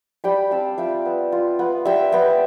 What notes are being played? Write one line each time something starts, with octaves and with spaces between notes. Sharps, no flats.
G3 G5 B5
C4 F5 A5
F4 E5 G5
B3
F4
B3
G3 E5 G5
B3 E5 G5